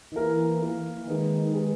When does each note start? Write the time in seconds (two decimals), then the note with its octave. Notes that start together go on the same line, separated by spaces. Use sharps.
0.12 D#3
0.16 E3 A#3 E4 A#4
0.61 A#3 E4 A#4
0.97 E3
1.07 D#3 G#3 D#4 G#4 B4
1.52 G#3 D#4 G#4 B4